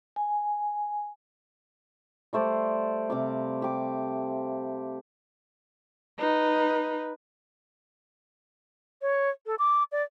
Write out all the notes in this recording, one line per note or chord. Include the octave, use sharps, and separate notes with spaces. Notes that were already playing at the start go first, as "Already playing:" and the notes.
G#5
G3 A3 C5 D5
C3 F5 D6
G4 D6
D#4 B4
C#5
A4
D6
D5